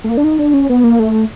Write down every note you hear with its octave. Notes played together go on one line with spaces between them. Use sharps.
A3
A#3
D4
D#4
D4
C#4
B3
A#3
A3